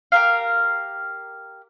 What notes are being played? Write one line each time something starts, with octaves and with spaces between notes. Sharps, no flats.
G4 A#4 F5